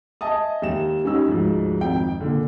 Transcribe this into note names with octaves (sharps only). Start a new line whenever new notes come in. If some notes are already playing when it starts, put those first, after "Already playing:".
D#5 E5 G#5 A5 D#6
D#2 E7
G3 C#4 D#4 E6
D2 G#2 F3
G#1 F2 G5
A#2 D3